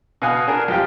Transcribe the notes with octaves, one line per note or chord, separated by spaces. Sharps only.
B2 F5 G#5 D#6 F#6
D4 G#4 A#4
F2 F4 G4 G5